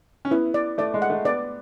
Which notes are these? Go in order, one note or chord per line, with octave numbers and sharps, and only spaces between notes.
C#4
B3 E4
D5
A3 D5
G#3
F#5
A3
B3 D5